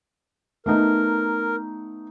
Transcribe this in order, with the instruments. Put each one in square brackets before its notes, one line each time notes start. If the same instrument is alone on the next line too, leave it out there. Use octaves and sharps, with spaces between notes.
[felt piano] A3 B3 D#4 [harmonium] A#4